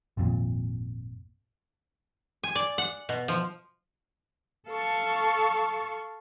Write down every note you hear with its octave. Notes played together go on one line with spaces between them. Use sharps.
G#1 F2 A#2
G#5
D5
F#5
B2
F3
A4 F5 A5 C#6